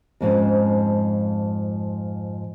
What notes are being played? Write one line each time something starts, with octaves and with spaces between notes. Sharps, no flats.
F2 G#2 F3 C#4